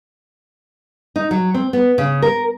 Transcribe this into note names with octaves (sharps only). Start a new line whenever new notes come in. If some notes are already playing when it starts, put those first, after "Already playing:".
D#4
F#3
C4
B3
C#3
A#4